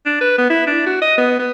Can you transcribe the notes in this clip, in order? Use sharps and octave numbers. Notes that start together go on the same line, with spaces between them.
D4
B4
B3
E4
D4
F#4
D#5
B3
B3